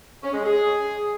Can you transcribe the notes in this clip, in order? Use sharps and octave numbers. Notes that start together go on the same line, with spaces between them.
C#4
G#3
G#4